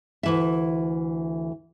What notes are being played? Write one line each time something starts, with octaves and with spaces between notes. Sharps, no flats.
D2 E3 E5